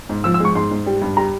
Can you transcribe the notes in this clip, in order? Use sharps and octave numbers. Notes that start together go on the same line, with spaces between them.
G#2
F3 E6
E6
G#3 C#6
G#2 C6
G#2
G3
G2
G3 A#5